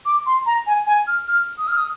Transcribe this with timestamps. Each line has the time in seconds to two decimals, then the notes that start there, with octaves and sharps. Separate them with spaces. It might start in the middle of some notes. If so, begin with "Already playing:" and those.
0.06 D6
0.26 C6
0.46 A#5
0.67 G#5
0.87 G#5
1.07 F6
1.28 F6
1.58 D#6
1.68 F6
1.77 D#6